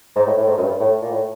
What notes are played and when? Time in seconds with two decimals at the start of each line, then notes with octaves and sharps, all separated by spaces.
0.16 G#2
0.27 A2
0.37 A2
0.47 G#2
0.57 F#2
0.63 G2
0.80 A2
1.01 A#2
1.11 A2